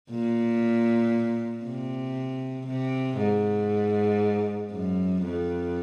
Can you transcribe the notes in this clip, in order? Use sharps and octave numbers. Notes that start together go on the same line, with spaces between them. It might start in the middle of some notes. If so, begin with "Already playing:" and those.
A#2
C3
C3
G#2
F#2
F2